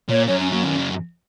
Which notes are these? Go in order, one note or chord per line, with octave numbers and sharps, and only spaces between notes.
A#2 C#5
F#2 C#5
C#4
F#3 A#3
D#3 C#4
C#3